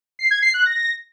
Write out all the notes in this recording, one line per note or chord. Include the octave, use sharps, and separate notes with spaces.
C7
G#6
C7
F#6
A#6